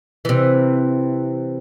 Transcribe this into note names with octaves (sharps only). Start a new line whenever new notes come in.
C3 E3